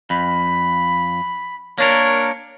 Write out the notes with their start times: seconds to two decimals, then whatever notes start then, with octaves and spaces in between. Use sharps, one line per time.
0.10 F2 B5
1.78 A#3 D4 A#4 C#5